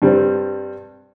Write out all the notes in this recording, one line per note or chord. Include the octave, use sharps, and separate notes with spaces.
G2 G3 C4